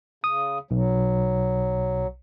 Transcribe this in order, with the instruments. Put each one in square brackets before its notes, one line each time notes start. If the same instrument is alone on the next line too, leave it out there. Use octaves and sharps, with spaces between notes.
[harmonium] C#3 [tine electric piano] D#6
[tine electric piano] B1 [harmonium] F#3